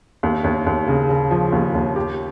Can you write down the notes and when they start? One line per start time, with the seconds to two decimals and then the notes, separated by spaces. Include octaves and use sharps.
0.23 D#2
0.44 D#2
0.66 D#2
0.88 C#3
1.09 C#3
1.31 F3
1.52 D#2
1.75 D#2
1.96 G4